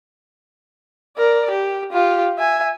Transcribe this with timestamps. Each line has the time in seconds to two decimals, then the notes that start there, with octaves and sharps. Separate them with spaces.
1.17 A#4 D5
1.51 G4
1.92 F4 G4
2.39 E5 G#5